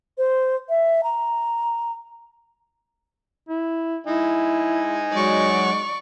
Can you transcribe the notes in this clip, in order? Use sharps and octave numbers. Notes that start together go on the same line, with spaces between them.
C5
E5
A#5
E4
D#4 E4 G#5
F#3 G#3 D5 C#6